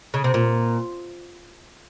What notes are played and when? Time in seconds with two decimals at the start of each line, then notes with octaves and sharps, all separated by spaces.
0.14 C#3
0.24 C3
0.34 A#2